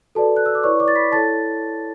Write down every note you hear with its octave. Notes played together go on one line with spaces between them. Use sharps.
F#4 A4 B4 D5 A5
F#6
E6
D6
E4 B4 C#5 D5 C#6
D5 D6
A6
B5 B6
E4 A4 C#5 A5 A6